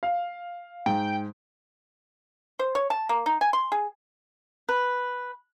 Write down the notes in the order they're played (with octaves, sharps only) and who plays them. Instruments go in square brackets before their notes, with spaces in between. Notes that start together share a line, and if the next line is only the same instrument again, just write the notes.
[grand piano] F5
[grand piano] G#2 [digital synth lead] G5
[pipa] C5
C#5
A5
A#3
D#4
G#5
C6
G#4
[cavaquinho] B4